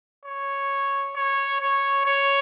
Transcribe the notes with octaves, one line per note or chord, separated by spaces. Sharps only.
C#5
C#5
C#5
C#5